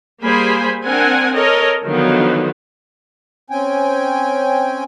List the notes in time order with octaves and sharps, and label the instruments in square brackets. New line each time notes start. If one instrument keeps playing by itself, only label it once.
[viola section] G3 A#3 G#4 C5 G#5 B5
C4 D4 A#4 F#5 G#5
A4 A#4 C#5 D#5
D3 D#3 F3 F#3 B3
[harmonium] C4 C#4 G5 G#5